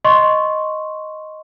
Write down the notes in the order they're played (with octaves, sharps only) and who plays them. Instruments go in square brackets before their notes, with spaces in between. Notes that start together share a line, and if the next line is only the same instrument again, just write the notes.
[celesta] D#5 C6 C#6